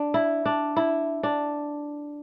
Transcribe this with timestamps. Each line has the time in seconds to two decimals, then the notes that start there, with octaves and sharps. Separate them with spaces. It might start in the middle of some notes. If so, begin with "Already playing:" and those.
Already playing: D4
0.14 E4
0.45 D4
0.76 E4
1.23 D4